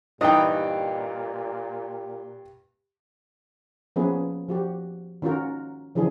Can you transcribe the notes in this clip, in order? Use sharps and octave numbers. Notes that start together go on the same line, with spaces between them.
G2 A#2 E3 D#4 G4 B4 D#5 G5
F3 A#3 B3 C#4 G#4 B4
F3 F#4 G4
D#3 C#4 F4 F#4 A#4
C#3 E3 F3 D4 G#4